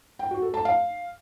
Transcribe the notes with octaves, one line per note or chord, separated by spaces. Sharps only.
G5
F#4
A4
A5
F5